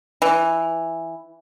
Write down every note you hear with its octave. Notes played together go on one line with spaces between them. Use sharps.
E3